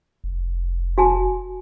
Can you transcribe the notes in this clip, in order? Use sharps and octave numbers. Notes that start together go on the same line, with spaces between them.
F1
F#4 G#5 A5